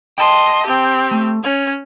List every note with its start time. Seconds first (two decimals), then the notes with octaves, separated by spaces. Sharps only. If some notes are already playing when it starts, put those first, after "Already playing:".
0.18 D#5 G5 A5 C6
0.66 C4 G4
1.11 A3
1.44 C#4 C#5